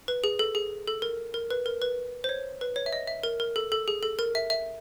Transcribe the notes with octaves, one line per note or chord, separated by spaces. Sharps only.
B4
G#4
A4
G#4
A4
A#4
A#4
B4
A#4
B4
C5
C#5
B4
C#5
E5
D#5
E5
A#4
A#4
A4
A4
G#4
A4
A#4
E5
E5